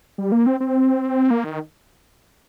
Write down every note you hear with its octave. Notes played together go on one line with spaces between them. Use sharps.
G3
A#3
C4
C4
A#3
D#3